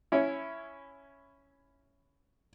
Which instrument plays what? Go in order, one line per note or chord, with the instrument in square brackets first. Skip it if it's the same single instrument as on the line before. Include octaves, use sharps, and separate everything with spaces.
[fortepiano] C#4 E4